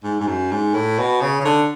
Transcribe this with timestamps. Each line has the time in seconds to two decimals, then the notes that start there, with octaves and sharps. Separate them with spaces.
0.04 G#2
0.20 G#2
0.27 F#2
0.52 G#2
0.74 A2
0.98 B2
1.21 C#3
1.40 C#3
1.45 D3